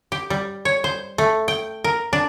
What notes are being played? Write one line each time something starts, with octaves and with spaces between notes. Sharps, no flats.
G4
G3
C#5
C5
A3
G5
A#4
D4